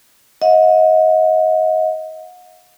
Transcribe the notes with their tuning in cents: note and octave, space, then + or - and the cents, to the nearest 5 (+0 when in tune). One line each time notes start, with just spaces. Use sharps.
D#5 +25 F#5 -35